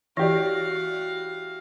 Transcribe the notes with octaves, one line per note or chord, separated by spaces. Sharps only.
E3 E4 F#4 G4 D5 F5